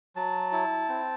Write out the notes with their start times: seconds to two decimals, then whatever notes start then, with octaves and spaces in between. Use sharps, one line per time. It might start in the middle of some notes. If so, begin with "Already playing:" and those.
0.16 F#3 A5
0.52 E4
0.89 C4